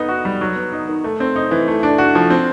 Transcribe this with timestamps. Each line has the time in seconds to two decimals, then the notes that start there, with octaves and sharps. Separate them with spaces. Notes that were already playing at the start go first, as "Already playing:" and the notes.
Already playing: B3 D#4
0.08 F#4
0.25 G3
0.41 F#3
0.56 B3
0.72 D#4
0.88 D#3
1.04 A3
1.20 C4
1.36 D#4
1.51 E3
1.68 A3
1.83 D4
1.98 F#4
2.15 F3
2.30 C4